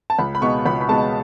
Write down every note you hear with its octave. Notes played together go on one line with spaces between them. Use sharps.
A5
C#2 B5
B5
B2 G#3 B3 D#4 C#6
C#2 B5
B5
B2 G#3 B3 D#4 A5